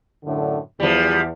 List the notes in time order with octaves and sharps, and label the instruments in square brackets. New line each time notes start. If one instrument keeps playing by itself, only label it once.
[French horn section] F#2 A2 D3
[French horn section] E2 [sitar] F3 G3